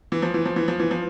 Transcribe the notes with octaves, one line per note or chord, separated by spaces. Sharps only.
E3
F3
E3
F3
E3
F3
E3
F3